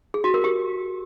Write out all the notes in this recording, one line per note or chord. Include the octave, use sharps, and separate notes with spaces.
G#4
F#4
A#4
G4